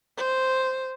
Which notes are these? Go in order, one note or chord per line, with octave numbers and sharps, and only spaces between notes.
C5